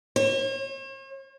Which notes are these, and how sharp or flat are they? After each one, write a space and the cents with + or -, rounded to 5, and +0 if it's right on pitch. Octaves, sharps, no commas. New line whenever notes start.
C#5 -45